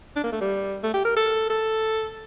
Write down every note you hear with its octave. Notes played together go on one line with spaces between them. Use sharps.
D4
A#3
A3
G3
A3
G4
A#4
A4
A4